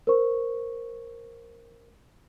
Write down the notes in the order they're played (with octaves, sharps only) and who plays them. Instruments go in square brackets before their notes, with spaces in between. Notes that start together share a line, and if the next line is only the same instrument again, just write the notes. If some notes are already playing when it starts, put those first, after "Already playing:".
[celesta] A#4 C5 C#6